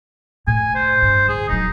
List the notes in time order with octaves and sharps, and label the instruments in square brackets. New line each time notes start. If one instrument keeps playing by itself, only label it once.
[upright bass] A2 [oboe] G#5
[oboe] C5
[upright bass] G2
[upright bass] D3 [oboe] G#4
[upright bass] D#1 F#3 [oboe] D#4